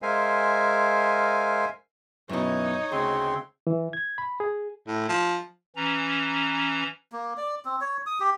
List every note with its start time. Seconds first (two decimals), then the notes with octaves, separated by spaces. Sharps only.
0.02 G#3 A#4 C5 E5 F5 G#5
2.29 F#2 B2 E3 D#4 C#5
2.92 D2 C#3 C4 C6
3.67 E3
3.93 G#6
4.18 B5
4.40 G#4
4.87 A2
5.09 F3
5.76 E3 C#4 A#5
7.12 A#3
7.37 D5
7.65 C4
7.81 C#5
8.06 D#6
8.20 G4